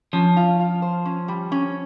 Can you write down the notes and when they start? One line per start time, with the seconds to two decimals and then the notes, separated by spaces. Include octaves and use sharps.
0.13 F3 C#4
0.37 F4
0.60 F4
0.82 C5
1.05 C#4
1.28 G3
1.52 C#4